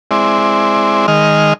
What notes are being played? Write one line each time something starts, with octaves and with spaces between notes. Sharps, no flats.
G#3 C4 E4 D5
D#3 G#3 D#5 F6